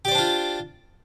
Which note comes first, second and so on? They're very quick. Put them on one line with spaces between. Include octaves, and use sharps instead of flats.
G4 D5 C5 D4 F4